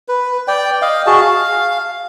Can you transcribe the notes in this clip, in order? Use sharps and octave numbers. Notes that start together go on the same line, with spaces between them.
B4
D5 G5
D#5 F5
F#4 G#4 A5
F5